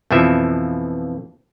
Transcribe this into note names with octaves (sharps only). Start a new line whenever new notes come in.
F2 B2 E3 F3 E5